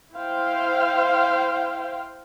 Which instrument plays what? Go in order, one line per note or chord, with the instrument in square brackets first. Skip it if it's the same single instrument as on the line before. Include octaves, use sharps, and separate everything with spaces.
[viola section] E4 C5 F5 G5